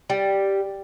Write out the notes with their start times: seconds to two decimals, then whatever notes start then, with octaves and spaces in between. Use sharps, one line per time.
0.10 G3